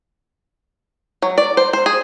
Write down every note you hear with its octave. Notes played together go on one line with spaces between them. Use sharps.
F#3
D5
C5
C5
G#4